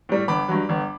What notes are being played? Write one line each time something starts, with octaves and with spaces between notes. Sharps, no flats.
A2 G3
G1 B5 D6
G2 F#3
G1